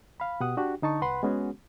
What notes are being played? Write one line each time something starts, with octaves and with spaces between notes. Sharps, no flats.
F5 B5
B2 G4 F#5 D#6
D4 F#4 G4
D3 D#4 A5 C#6
C2 B4 F#5 B5 C6
G#3 B3 C#4 F#4 G#4